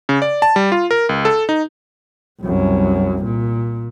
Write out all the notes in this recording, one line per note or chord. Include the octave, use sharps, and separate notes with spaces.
C#3
D5
A5
G3
F4
A#4
C#2
A4
D#4
C2 F#2
A#2